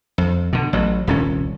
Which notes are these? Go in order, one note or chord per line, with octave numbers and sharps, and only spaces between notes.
F2
B2 D3
A1 F#3
D#1 C2 C#4